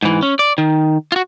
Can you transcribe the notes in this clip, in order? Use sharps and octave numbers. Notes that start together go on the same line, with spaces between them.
G#2 E3
C#4
D5
D#3
F4 F#4